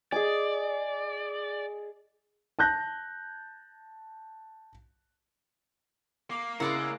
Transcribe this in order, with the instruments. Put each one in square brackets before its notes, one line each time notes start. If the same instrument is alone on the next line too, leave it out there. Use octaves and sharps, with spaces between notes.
[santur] G#4 D#5 G#5 [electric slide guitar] D5
[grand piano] A5 F#6 G6 A#6
[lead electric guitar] A#3 [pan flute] D6
[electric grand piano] C#3 E4 A#4 [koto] G#3 D5 F#5 [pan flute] E6